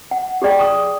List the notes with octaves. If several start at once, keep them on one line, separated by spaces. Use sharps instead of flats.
F#5
G4 G#4 D5 G5
C#6 D#6